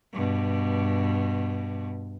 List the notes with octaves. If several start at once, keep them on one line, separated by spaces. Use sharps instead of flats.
G2 B2